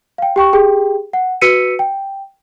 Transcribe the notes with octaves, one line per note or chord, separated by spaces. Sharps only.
F5 G5
G4 G5 C#6
G4 G#4 G5
F#5
F#4 B4 E6 B6 C#7 D#7
G5